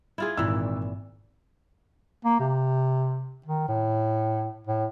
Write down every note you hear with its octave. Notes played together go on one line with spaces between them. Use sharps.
E4 F4 G#4
G#1 A#2 E3 E6
A#3
C3
D#3
A2
A2